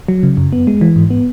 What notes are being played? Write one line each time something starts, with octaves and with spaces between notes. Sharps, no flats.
F#3
C#3
F#2
B3
G#3
E3
G#2
B3